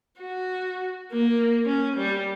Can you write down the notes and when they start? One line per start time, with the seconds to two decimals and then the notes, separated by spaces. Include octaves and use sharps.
0.20 F#4
1.12 A#3
1.66 C#4
1.97 G3